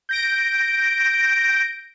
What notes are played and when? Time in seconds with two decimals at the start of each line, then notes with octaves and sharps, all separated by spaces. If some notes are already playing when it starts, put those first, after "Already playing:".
0.09 G6 A#6 D7